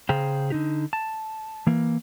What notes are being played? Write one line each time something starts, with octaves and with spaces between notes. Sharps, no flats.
C#3 G#4 C5 F5 G5 A#5
D3 D#4 G4
A5
E3 A#3